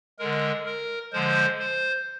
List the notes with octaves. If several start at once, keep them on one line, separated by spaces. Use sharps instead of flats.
D3 G#3 A#4
A#4
D3 F3 G#3 C5
C5